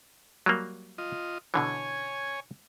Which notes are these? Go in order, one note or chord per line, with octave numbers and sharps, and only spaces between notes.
F#3 G3 A#3
F4 D#5
B2 D3 E3 C#5 G#5